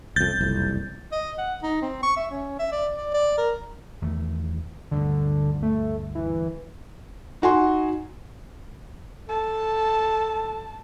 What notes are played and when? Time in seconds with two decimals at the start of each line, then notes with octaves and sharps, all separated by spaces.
0.16 C2 F2 G6 A6
0.38 F#1 C2 F2
1.12 D#5
1.38 F#5
1.63 D#4
1.82 C4
2.03 C#6
2.16 E5
2.31 C#4
2.59 E5
2.72 D5
2.96 D5
3.14 D5
3.38 A#4
4.02 E2 D#3 A3
4.91 D2 G2 D3
5.62 A3
6.15 E3
7.42 D#4 F#4 G#5 C6
9.29 A4 A5